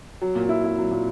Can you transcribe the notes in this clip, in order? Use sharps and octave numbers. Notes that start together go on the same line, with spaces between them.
F#3
A#2
E4
E4
F#3
A#2